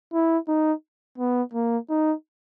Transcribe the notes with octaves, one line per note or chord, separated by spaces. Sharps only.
E4
D#4
B3
A#3
D#4